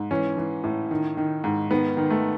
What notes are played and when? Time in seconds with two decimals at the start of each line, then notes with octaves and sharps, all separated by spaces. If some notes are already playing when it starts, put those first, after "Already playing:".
Already playing: G#2
0.11 E3 C#4
0.37 E3
0.64 A2
0.91 D#3
1.17 D#3
1.44 G#2
1.71 D#3 B3
1.97 D#3
2.10 A3